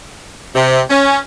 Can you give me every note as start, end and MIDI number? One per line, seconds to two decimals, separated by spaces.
0.55 0.80 48
0.90 1.18 61